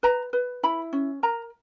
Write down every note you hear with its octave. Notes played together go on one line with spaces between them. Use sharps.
B4 A#5
B4
E4 B5
C#4
A#4 A#5